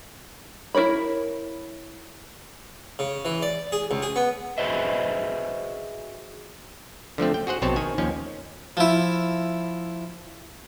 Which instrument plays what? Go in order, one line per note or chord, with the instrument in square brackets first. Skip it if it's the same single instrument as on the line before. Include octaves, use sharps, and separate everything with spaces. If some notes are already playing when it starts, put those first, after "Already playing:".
[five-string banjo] E4 F4 A#4 C#5 B5
[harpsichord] C#3
E3
D5
G#4
C#2
G#4
B3
[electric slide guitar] F#4 G#4 B4 C5 D#5 E5
[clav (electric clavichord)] D3 F3 A3 C4
G5
F#4 G#4 C5 F#5
A#1 B2 C4 C5 C#5 A5
D#3 G#5
D#2 F3 C#4
[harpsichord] F3 E4